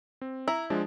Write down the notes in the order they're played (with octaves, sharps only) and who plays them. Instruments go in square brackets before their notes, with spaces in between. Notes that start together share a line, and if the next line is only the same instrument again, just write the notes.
[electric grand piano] C4
[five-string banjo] E4 [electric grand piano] A#5
[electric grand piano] F3 G#3 D4